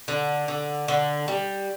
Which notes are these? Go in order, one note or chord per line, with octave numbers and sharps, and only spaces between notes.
D3
D3
D3
G3